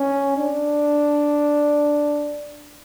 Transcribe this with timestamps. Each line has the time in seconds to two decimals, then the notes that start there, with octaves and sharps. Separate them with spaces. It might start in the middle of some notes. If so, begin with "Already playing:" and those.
Already playing: C#4
0.37 D4